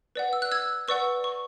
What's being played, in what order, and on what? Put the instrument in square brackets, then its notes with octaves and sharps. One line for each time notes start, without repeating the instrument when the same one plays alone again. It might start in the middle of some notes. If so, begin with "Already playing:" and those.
[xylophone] B4 D5 F#5
E6
F#6
E6 G#6
B4 D5 F#5 C#6 E6
C#6